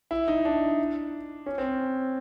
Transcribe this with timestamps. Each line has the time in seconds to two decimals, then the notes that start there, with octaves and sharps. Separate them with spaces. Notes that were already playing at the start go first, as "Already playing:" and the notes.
0.11 E4
0.28 D#4
0.45 D4
1.46 C#4
1.58 C4